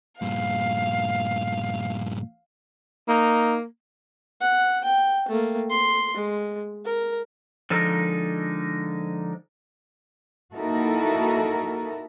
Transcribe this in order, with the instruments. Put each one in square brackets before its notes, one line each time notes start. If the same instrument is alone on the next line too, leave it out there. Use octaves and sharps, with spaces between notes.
[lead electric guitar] G2 A#2 [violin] F5
[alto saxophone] A#3 [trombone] D#4
[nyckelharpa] F#5
G5
A3 A#3
C6
G#3
A#4
[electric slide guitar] D3 F3 G#3 D#4 A4 A#4
[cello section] A#3 D#4 E4 F#4 A4 A#4